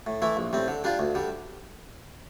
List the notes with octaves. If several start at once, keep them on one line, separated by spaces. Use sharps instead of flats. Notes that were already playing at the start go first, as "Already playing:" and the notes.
A2
E3 A3 E4
A#1
A2 G3 C4
D3
G3 D4 F4
D2
D3 G3